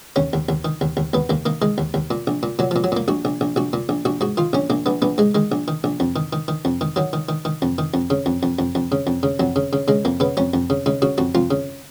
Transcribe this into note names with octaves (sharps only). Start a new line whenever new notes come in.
D#2 C#4
D#2
D#2
D#3
D#2
D#2
D#2 B3
D#2 A#3
D#3 A#3
D#3 G#3
D#2
D#2
A#2
A#1
A#2
A#2 F#3
A#2 F3
F#3
A#2 A#3
A#1 F#4
A#1
A#1
A#1 F#4
A#2
A#1
A#1 F#4
G#2 F#4
D#3 F4
A#1 C#4
A#1 A#3
A#1 B3
A#1 B3
G#2 G#3
D#3 G#3
A#1
D#3
A#1
F2
D#3
D#3
D#3
F2
D#3
D#3 F#3
D#3
D#3
D#3
F2
D#3
F2
C#3
F2
F2
F2
F2
C#3
F2
C#3
F2 F#3
C#3
C#3
C#3 G#3
F2 A#3
C#3 B3
F2 C#4
F2
C#3
C#3 D#4
C#3 F#4
F2 F#4
F2 F4
C#3